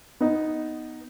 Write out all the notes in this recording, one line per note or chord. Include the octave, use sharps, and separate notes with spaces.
B3 D#4